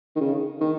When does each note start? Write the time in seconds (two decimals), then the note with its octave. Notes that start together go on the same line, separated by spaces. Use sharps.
0.16 D#3
0.20 C#3
0.60 D#3